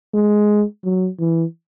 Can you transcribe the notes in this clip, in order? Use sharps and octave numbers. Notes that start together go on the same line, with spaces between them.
G#3
F#3
E3